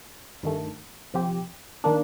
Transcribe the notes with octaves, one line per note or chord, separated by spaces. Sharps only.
G2 D#3 A3
C3 F3 C4 G4
D#3 A#3 D4